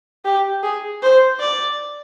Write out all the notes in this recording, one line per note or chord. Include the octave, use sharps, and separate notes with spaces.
G4
G#4
C5
D5